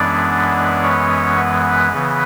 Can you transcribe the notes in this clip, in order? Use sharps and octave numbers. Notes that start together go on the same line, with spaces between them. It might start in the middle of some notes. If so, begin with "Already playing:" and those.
Already playing: F#2 E3 G#3 B3 D4 D5
C#4 C#5
B3 B4
C#3 E3 B3